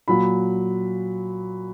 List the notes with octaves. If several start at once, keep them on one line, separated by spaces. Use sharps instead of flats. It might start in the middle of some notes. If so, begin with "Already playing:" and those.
A#2 F#3 B5